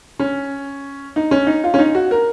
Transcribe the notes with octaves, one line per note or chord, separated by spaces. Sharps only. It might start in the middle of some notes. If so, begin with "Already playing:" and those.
C#4
D#4
C#4
D#4
F4
C#4
D#4
F#4
A#4